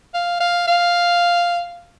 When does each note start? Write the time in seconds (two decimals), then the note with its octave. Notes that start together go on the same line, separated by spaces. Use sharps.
0.14 F5
0.40 F5
0.67 F5